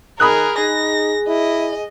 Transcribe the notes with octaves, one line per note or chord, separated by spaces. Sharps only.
D#3 G#4 A#4 B5 D#6 F#6
D#4 G#4 A#6
E4 D#5